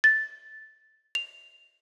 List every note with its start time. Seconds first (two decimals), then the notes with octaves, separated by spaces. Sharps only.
0.04 A6
1.15 F7